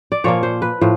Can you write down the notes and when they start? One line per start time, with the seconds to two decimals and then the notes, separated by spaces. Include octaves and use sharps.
0.12 D5
0.24 A#2 F3 A#3 C#5
0.43 C5
0.62 B4
0.81 A2 F3